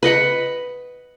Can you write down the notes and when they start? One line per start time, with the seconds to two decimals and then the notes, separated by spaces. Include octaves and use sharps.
0.03 B4 D#5 F#5 B5